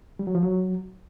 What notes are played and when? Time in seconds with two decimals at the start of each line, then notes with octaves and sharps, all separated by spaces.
0.19 G3
0.27 F#3
0.35 F3
0.43 F#3